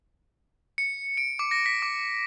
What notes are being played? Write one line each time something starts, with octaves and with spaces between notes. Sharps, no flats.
C#7
D7
D6
A#6
B6
D6